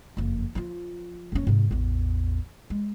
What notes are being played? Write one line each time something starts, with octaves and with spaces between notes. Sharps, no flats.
F#1 F2
F3 F4
F1 C#4
G#2 C3
A1 E2
G#3